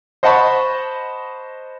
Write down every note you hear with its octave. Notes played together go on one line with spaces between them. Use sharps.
C5 D#5 F#5 A5 B5 C#6